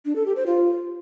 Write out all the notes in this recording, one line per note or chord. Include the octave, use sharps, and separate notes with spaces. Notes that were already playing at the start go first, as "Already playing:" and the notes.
D4
A4
G4
C5
F4